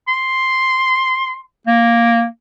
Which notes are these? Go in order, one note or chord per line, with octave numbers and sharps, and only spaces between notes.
C6
A#3